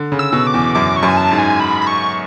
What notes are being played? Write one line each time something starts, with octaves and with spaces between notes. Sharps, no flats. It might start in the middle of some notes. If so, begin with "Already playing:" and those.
Already playing: D3
C#3
E6
B2
D6
E2
F#2 D6
C#6
F#2
G#5
A5
G#2
G#5
B5
B5
C#6